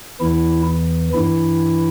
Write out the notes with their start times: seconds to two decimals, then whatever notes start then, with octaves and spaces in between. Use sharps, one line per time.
0.20 E2 E3 E4
1.14 G2 E3 E4